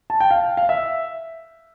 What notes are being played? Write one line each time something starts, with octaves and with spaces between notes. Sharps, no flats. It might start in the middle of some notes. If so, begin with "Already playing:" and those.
A5
G5
F5
F5
E5